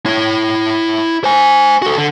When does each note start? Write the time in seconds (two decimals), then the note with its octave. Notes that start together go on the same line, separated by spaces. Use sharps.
0.06 E4 C#5
1.24 C5 G#5
1.82 F#4 A4
1.98 D3